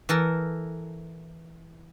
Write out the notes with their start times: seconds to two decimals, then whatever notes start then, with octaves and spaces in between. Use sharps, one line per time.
0.09 E3 A4 A#4